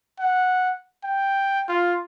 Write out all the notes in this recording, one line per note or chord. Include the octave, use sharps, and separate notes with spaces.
F#5
G5
F4